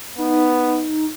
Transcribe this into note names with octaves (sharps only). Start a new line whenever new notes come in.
B3 D#4